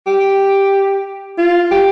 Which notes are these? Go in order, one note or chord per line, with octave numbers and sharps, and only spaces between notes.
G4
F4
G4